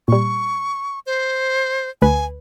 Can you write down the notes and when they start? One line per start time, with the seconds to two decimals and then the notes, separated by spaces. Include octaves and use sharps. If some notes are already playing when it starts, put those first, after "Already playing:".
0.08 A#2 G3 C#6
1.06 C5
2.02 D2 B4 G#5